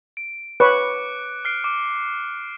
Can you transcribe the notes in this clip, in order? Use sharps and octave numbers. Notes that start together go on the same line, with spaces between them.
D7
B4 C#5 C#6 D6 F#6 C#7
F6 C7 D7
D6